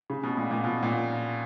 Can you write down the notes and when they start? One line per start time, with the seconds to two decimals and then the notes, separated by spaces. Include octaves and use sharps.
0.10 C#3
0.23 B2
0.37 A#2
0.51 A#2
0.64 B2
0.83 A#2